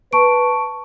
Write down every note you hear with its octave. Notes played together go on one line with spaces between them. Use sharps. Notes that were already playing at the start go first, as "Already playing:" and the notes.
B4 A5 C#6 D7